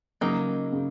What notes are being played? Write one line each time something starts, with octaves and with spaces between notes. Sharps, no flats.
C#3 F#3 A#3 D#4
C#3